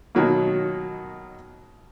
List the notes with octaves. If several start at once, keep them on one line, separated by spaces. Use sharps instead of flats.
B2 D#3 F#3 A#3